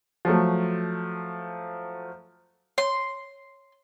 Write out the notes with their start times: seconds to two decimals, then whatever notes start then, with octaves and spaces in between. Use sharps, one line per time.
0.25 F3 F#3 A3
2.78 C#5 C6